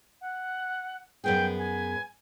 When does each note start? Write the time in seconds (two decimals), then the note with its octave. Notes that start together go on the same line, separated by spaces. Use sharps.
0.21 F#5
1.24 F#2 B3 G#4 G5
1.59 G#5